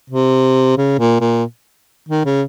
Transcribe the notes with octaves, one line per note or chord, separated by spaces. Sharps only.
C3
C#3
A#2
A#2
D#3
C#3